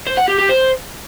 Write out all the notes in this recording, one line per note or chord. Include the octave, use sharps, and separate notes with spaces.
C5
F#5
G4
G4
C5